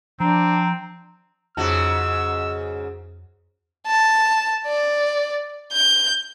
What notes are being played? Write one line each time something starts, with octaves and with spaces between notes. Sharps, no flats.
F3 C4 D4 A#5
F2 G#2 C#3 F#4 E6
A5
D5
G6